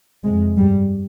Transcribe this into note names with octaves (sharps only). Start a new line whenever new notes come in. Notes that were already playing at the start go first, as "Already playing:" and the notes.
F2 C3 G#3
G2 G3